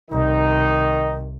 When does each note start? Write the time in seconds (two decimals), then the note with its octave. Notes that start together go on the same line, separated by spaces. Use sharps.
0.11 C2 D#3 D#4